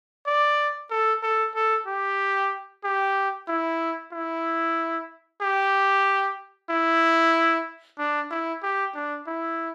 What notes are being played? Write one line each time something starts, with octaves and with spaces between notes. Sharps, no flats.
D5
A4
A4
A4
G4
G4
E4
E4
G4
E4
D4
E4
G4
D4
E4